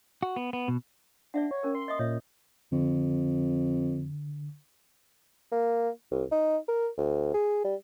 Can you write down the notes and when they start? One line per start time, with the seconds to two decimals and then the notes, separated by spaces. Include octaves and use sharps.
0.23 F#4
0.36 B3
0.53 B3
0.68 B2
1.34 D4 D5 E5 F#5
1.51 C#5
1.63 C#4 A#4
1.75 C6
1.88 D#5 E5 D#6
1.99 A#2 C#5 E5
2.72 F2 D3
5.52 A#3
6.11 C2
6.31 D#4
6.68 A#4
6.97 D2
7.34 G#4
7.65 G3